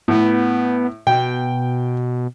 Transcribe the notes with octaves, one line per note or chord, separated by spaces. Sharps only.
A2 B3
B2 G5